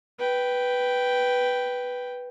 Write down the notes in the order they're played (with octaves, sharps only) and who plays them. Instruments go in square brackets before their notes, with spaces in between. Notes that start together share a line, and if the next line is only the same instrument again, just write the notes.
[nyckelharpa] B4 G5